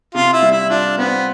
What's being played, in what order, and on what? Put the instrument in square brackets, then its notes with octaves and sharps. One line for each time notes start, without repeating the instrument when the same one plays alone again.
[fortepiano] C3 [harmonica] F4
[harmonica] E4
[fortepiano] G3
[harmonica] E4
[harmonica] D4 [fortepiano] F4
[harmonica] B3 [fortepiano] C4